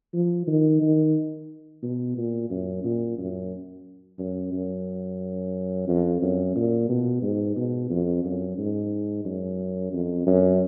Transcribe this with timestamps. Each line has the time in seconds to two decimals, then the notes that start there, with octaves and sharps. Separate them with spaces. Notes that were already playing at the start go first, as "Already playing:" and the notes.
0.14 F3
0.47 D#3
0.81 D#3
1.83 B2
2.17 A#2
2.50 F#2
2.84 A#2
3.18 F#2
4.19 F#2
4.53 F#2
5.88 F2
6.22 F#2
6.56 A#2
6.89 B2
7.22 G#2
7.56 B2
7.90 F2
8.25 F#2
8.58 G#2
9.25 F#2
9.93 F2
10.27 F#2